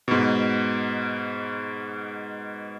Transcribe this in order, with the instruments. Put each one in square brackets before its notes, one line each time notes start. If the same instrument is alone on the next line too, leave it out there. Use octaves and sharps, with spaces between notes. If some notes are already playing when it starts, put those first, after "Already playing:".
[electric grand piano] G#2 B2